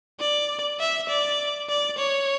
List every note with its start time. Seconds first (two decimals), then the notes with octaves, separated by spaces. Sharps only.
0.20 D5
0.80 E5
1.09 D5
1.69 D5
1.98 C#5